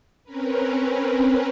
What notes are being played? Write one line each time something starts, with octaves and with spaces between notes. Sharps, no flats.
C4 C#4 A#4 B4